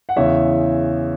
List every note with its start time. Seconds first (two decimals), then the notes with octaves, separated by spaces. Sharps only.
0.09 F#5
0.16 E2 C#3 E3 C#5 E5